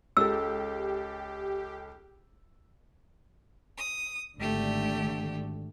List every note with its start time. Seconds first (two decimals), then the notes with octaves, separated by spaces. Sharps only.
0.17 C#2 G4 A4 E6
3.78 D#6
4.39 G#1 D3 A3 G4